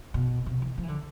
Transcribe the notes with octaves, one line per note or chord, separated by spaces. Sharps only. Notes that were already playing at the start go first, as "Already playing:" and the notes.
B2
C3
E3
F3
E3
D3